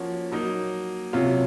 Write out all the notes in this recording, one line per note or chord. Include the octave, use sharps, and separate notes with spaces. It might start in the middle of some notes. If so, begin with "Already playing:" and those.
Already playing: F3 A#3 C#4 F#4
F#3 A#3 D#4
C3 F#3 C#4 F4